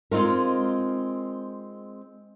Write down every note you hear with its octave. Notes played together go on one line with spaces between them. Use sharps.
G#3 C4 D#4 F4 A#4